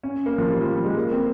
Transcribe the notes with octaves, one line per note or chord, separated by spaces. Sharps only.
C#4
A#3
F3
G3
F3
G3
G#3
A#3
C4